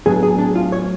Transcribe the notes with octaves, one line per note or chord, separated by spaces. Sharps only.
A2 F#3 B3 D4 G#4
G#4
D4
F4
C#5